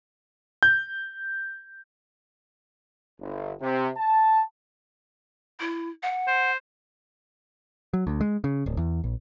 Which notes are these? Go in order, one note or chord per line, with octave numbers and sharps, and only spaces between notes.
G6
G1
C3
A5
E4
F#5
C5
F#3
D2
G#3
C#3
D1
E2
A#1